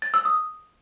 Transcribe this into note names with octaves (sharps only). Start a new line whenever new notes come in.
A6
E6
D#6